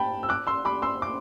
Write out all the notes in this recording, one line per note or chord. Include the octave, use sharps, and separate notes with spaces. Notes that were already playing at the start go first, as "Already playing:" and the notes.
Already playing: G5 A5 B5
E6
D6 F#6
C6 E6
B5 D6
C6 E6
D6